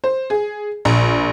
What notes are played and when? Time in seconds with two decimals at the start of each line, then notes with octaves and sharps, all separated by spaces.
0.04 C5
0.30 G#4
0.85 A#1